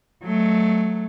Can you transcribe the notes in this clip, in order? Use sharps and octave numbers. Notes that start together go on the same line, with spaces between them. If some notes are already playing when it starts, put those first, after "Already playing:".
F#3 A3